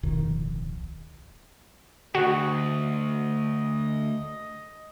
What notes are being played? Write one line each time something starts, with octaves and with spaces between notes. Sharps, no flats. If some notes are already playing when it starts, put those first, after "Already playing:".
D1 B1 F2 D#3
D2 F#4 D#5